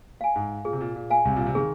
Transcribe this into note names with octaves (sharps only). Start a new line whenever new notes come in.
F5 G#5
G#2
A#2 G#4
C3
A#2
A#2
F5 G#5
C2 C3
A#2
C3
D#3 G#4